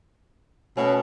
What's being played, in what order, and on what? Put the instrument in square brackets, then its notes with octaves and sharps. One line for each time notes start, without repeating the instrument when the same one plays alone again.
[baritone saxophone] B2 [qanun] A3 B3 F#4 [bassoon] C#4